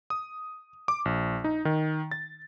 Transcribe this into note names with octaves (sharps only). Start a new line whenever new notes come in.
D#6
D6
A#1
D#4
D#3
A6